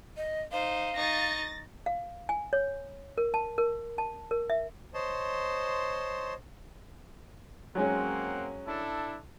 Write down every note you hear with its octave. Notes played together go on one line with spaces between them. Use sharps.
D#5
D#4 C5 F5
D#4 C#6 A6 A#6
F5
G#5
C#5
A#4
A5
A#4
A5
A#4
E5
C5 C#5 D#5 A5 C6
F#3 G#3 A#3 C4 C#4 F#5
D4 E4 A4